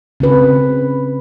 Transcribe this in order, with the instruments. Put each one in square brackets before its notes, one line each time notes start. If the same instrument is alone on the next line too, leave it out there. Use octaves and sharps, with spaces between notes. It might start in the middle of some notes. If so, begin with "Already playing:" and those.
[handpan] C#3 C4 B4